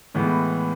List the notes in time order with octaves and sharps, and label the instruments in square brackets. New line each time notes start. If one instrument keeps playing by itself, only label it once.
[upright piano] A2 E3 G#3 B3